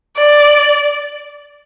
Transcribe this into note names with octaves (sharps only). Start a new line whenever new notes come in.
D5